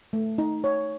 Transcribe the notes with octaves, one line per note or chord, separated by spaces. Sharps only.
A3
D#4
C#5